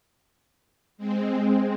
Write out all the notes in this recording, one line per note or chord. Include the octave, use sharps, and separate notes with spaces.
G#3 C4